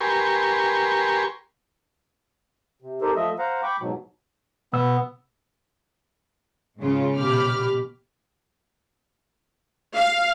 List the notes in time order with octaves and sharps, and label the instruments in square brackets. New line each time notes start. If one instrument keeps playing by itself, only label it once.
[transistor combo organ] G4 A#4 B4 G#5 C6 C#6
[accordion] C3
C4 D#4 G4 A4 A#4 C5
F3 A3 D#5 E5
C5 F5 F#5 A#5
G5 B5 C#6 D6
G#2 B2 F#3
[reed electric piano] B2 E6 [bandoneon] B3
[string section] G#2 C#3 C#4 F4
A#1 B2 G4 B5 D6 F6
[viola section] F5